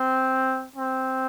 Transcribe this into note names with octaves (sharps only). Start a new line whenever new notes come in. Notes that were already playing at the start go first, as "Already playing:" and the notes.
Already playing: C4
C4